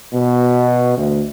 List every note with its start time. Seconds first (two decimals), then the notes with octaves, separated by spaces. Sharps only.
0.13 B2
0.97 D2